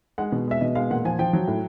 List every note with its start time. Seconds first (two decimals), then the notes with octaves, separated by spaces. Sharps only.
0.18 G#3 F#5
0.32 B2
0.48 G#3 E5
0.61 B2 D#5
0.75 G#3 F5
0.90 A#2 F#5
1.05 F3 G#5
1.19 F3 G5
1.33 F#3
1.48 A2